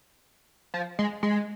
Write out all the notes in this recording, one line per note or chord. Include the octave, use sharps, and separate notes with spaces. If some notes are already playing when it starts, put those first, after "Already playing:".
F3
G#3
G#3